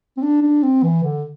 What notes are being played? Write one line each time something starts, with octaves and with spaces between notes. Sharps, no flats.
C4
D4
D4
C4
E3
D3